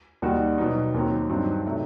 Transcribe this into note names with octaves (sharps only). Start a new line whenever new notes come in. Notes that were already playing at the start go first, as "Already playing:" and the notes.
D#2 D#3 G3 D#4 F#4
B2 F#3 B3 D#4
D#2 D#3 F#3 C4
G2 F#3 C4 D#4
C3 F#3 A3 D#4